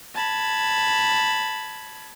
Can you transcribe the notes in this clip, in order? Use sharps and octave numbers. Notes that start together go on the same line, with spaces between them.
A5 B5 G#6